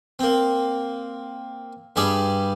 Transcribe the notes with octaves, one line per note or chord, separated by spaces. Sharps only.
A#3 C4
G2 G3 G#4 D5 B5